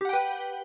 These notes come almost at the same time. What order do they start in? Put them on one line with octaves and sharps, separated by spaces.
G4 F#5 G5 B4